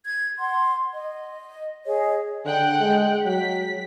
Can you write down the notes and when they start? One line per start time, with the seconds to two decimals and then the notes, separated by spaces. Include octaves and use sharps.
0.06 G#6
0.39 F#5 C6
0.94 D#5
1.85 G#4 C#5 D#5
2.45 D3 F#5 G5 F#6
2.80 G#3
3.25 F#3 B6